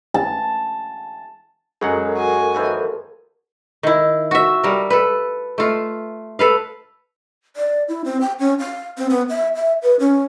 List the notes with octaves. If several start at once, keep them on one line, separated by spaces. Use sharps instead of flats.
A5
F#2 C#3 F#3 G#3 A4 A#4 F#5
F#4 G#5
D#2 E3 F3
D#3 E4
F#4 E5
G3 A#4
A4 B4
A3 F4
A4 B4 F5
D5
E4
C4
G5
C#4
F5
C4
B3
E5
E5
B4
C#4